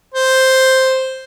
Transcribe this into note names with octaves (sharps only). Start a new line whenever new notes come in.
C5